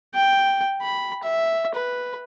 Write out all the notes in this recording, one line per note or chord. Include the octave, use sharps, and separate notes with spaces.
G5
B5
E5
B4